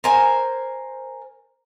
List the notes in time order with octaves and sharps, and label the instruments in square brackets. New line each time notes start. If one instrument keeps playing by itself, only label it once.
[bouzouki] A#4 C5 G#5